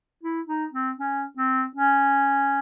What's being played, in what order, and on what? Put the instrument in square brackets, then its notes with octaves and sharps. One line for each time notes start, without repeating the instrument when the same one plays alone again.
[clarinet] E4
D#4
C4
C#4
C4
C#4